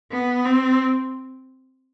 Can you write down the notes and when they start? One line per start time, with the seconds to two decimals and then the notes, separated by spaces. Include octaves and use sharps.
0.11 B3
0.45 C4